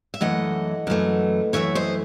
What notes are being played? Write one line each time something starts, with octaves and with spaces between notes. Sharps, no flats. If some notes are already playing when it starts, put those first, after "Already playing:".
E5
F#2 E3 A3 D#5 F#5
F#2 E3 A3
F#2 E3 A3 C#5 E5
C5 D#5